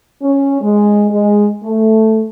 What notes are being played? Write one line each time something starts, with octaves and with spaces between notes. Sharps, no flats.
C#4
G#3
G#3
A3